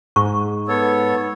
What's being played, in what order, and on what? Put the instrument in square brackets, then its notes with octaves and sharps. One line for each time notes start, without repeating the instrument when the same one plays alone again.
[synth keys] G#2 [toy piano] C#6
[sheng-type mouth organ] B3 A4 C#5